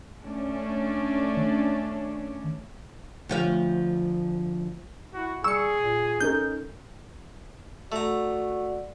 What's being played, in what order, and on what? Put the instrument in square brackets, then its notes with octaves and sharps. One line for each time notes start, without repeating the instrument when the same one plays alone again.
[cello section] A3 C#4 D4
[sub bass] D#3
[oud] D2 F3 F5
[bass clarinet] E4 [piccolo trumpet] F#4
[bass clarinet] G3 [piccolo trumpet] G#4 [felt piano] C#6 [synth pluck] E6 C#7
[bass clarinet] A#2
[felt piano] C#4 A4 A#4 [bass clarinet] D#4 [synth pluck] G6
[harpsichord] A3 A#5 [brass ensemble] F#4 D5